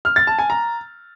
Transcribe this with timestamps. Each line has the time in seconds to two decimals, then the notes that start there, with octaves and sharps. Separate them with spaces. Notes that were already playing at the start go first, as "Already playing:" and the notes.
0.05 F6
0.16 A6
0.27 A5
0.39 G#5
0.50 A#5